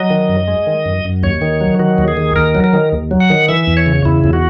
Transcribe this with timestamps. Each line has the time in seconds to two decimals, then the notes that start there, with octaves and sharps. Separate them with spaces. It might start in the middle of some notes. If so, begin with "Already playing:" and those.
Already playing: F#3 D#5
0.10 D#3
0.29 F#2
0.48 G#3
0.67 D#3
0.86 F#2
1.05 F#2
1.23 D#2 C#5
1.42 D#3
1.61 F#3
1.79 D#3 F#4
1.98 D#2
2.08 G#4
2.17 D#3
2.36 D#2 A#4
2.55 F#3
2.64 A#4
2.73 D#3
2.92 D#2
3.11 F#3
3.20 F#5
3.30 D#3
3.48 E3 E5
3.67 E2
3.77 C#5
3.86 C#3
4.05 E2 E4
4.24 E2
4.33 F#4